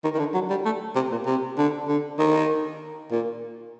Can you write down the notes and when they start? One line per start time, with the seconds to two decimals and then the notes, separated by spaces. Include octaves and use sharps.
0.04 D#3
0.14 D#3
0.19 D3
0.34 F#3
0.50 G3
0.65 A3
0.95 C3
1.11 A#2
1.26 C3
1.57 D3
1.87 D3
2.18 D#3
3.11 A#2